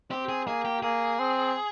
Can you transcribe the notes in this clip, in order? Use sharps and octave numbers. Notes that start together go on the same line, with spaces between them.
C4 G4
G#4
A#3 G#4
G4
A#3 G#4
C4